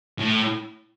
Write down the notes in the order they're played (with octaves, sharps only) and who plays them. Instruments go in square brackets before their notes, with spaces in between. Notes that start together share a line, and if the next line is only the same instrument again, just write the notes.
[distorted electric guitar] A2